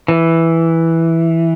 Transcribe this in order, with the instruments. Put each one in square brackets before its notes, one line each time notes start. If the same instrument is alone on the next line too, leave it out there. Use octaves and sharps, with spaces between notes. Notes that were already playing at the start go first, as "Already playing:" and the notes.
[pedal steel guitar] E3